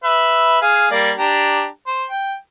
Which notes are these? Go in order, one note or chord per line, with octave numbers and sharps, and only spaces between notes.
B4 E5
G#4 F5
G3 A#3 D5
D4 G4 A#5
C5
G5